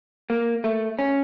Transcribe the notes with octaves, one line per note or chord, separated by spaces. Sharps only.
A#3
A3
C#4